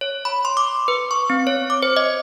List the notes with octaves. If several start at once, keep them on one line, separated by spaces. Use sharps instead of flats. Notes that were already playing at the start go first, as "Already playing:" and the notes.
C#5
B5
C6
D6
B4
C#6
C4
C#5
D6
C5
D#5